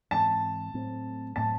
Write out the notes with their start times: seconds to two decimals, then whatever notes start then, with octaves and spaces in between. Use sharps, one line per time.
0.11 G#2 E3 G#3 C4 A5
0.73 A2 F#3 A3 C4
1.36 A2 F#3 A3 C4 A5